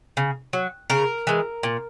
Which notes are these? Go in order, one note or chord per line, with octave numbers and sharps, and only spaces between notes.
C#3
F#3
C#3 A#4
E3 G#3
A#2